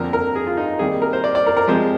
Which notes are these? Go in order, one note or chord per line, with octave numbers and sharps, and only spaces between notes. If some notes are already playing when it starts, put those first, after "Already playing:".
Already playing: F2 D3 F3 A#3 A#4
A#4
G#4
F4
D#4
C3 D#3 G3 A#3 G#4
A#4
C5
D5
D5
A#4
A#4
C3 F3 G#3 C5